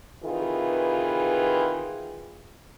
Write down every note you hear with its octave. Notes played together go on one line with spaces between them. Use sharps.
C3 D#3 E3 F4 G#4 B4